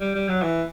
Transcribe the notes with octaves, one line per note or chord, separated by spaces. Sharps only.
G3
G3
F#3
E3